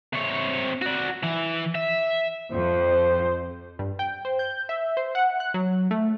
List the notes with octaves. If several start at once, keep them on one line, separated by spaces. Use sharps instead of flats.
C3 C#5
F#4 D5
E3
E5
F2 C5
G2
G5
C5
G6
E5
C5
F#5
F#6
F#3
A3